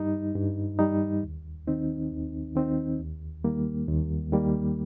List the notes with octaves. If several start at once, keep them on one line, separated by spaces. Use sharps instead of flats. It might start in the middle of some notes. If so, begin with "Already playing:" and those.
Already playing: G2 G3 D#4
G2
G3 D#4
D#2
D#3 C4 D#4
D#2
D#3 C4 D#4
D#2
D#3 G3 A#3
D#2
D#3 G3 A#3